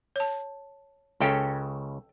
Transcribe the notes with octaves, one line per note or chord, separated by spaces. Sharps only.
C#5 A5
C#2 C#3 C#4 A4 G5